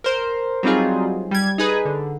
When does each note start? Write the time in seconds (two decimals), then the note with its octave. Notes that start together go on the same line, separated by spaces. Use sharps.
0.04 A#4 C5
0.63 F#3 G3 C4 D#4 F4 G#4
1.31 G3 G#6
1.58 D#4 G#4 B4
1.85 D3